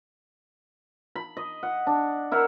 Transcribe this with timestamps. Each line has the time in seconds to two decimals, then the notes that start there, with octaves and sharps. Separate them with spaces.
1.16 B5
1.37 D#5
1.63 F#5
1.87 D4
2.32 E4 A#4 E5 F#5